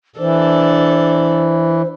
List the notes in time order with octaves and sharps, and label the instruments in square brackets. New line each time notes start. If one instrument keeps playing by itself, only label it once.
[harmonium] E3 [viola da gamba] D4 A4 [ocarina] C5